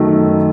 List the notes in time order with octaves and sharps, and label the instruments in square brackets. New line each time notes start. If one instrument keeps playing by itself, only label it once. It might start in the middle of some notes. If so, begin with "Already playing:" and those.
Already playing: [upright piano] F#2 D#3 F#3 A3